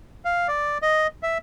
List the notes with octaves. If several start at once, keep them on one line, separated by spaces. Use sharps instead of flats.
F5
D5
D#5
E5